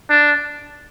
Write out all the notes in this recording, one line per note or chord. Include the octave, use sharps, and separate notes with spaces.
D4